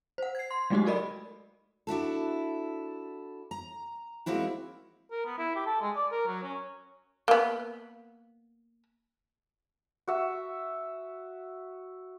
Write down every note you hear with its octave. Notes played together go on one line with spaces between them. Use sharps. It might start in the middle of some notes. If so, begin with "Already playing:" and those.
C5 F#5
G#6 C7
C6
F#3 G#3 A3 D#4 F#4 G4
F#4 A4 A#4 D5 D#5 B5
D4 E4 F#4 A4
A#5
G#3 A#3 C4 E4 F#4
A#4
B3
E4
G4
A4
G#3
D5
A#4
F#3
C#4
A#3 B3
F#4 E5